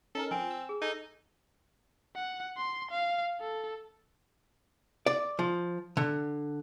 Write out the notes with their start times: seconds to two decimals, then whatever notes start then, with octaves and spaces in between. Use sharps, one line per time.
0.15 C#4 D#4 A4 A#4
0.31 F3 C4 G#5
0.51 E6
0.69 G#4
0.82 D#4 A4 G#5 A#5
2.15 F#5
2.57 C6
2.91 F5
3.40 A4
5.06 D5
5.39 F3
5.97 D3